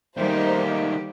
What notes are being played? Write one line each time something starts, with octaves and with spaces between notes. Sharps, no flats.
D#3 G3 A3 A#3 D#4 G4 C5